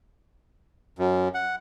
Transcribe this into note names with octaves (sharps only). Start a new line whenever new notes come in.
F#2
F#5